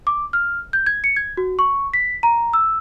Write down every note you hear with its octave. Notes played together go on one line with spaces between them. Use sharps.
D6
F6
G6
G#6
C#7
G#6
F#4
C#6
B6
A#5
E6